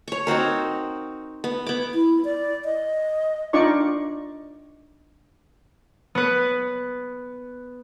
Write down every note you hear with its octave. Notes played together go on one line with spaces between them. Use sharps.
C#5 C#6
C4 D#4 F#4 A#4
B3
B3 D6
E4
D5
D#5
D4 D#4 F4 D5 C#6
B3 B4